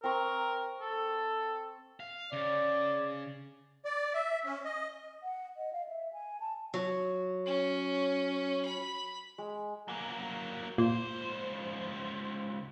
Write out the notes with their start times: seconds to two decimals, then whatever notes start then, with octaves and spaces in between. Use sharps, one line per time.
0.04 C4 A#4 A#5 C#6
0.81 A4
2.00 F5
2.33 C#3 D5
3.85 D5
4.14 E5
4.45 C#4
4.65 D#5
5.23 F#5
5.57 D#5
5.73 F5
5.88 E5
6.13 G#5
6.40 A5
6.74 F#3
7.46 C#4
8.65 B5
9.38 G#3
9.88 F#3 A#3
10.78 C#2 A#2 C5